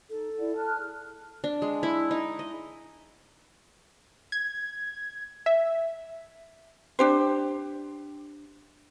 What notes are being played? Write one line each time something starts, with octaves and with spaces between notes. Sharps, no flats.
D#4 A4
E4 D5 F#5
A5 F6 F#6
G#4
D4
G#3
E4
D#4
D#5
G#6
E5
D4 G4 C5